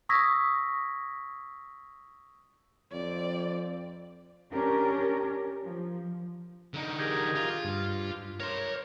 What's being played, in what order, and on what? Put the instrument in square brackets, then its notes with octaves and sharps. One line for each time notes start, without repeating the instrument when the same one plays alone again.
[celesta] C#6 D#6 E6 G#6 A#6 B6
[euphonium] F2 [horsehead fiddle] C4 D5
[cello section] C#4 D4 G4 A#4
F3
[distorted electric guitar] D3 D#4
[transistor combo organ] G4 G#4 A#4
[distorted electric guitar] F4
[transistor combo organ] G2
[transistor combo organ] A#4 [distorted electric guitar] C#5 C6